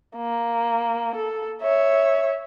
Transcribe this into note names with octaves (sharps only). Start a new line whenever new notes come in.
A#3
A4
C#5 E5